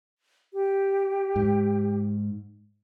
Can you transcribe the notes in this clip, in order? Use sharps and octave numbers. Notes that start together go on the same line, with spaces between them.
G4
G#2